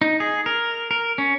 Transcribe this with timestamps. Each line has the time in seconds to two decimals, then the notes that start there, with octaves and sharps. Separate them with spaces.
0.02 D#4
0.20 G#4
0.46 A#4
0.91 A#4
1.18 C#4